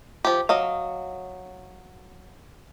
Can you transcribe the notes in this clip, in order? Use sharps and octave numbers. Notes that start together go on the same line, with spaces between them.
F3 G4
F#3 D#5 F5